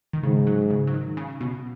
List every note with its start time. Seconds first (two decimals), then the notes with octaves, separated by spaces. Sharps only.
0.13 D#3
0.23 G#2 C#3
0.47 F#3
0.70 C#3
0.87 F#3
0.94 D#3
1.17 C#3
1.41 B2